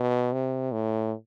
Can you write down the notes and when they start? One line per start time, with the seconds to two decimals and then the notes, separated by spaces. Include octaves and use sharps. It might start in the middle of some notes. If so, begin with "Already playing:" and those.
Already playing: B2
0.33 C3
0.72 A2